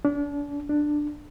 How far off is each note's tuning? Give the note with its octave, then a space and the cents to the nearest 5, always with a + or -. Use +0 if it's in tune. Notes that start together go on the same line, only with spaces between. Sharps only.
D4 -35
D4 +10